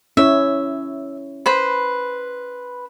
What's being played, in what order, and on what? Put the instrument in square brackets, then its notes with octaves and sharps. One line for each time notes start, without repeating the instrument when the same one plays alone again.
[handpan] C#4 E4 C#5 [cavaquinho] E5
[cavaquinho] B4 C5 B5